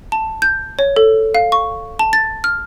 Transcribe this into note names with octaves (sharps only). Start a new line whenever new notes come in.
A5
G6
C#5
A4
F5
C#6
A5
A6
F6